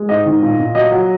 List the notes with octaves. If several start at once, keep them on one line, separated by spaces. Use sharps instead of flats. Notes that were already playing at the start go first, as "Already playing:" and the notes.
Already playing: G#3
G#2 D#5
D#3
A#2
A#2
F#3 D#5
F#3